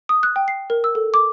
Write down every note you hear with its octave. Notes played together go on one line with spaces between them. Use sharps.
D#6
F#6
G5
C7
A#4
E6
A4
D6